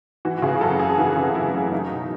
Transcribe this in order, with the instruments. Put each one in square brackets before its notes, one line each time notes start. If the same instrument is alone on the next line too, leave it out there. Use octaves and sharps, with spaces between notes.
[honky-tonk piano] E3 F#4
F#4
C#3 G#4
F#2 A4
F#2 G#4
E3 F#4
C#3
F#2 E4
F#2
F#3 D#4
B2